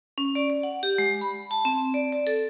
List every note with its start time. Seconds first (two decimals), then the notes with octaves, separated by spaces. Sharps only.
0.18 C#4
0.35 D5
0.50 D5
0.63 F#5
0.83 G4
0.98 G#3
1.21 B5
1.51 A5
1.65 C4
1.94 D5
2.12 D5
2.27 A4